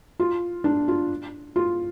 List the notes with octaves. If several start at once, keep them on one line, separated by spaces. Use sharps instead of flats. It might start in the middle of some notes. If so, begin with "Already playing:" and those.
F4
D4
F4
F4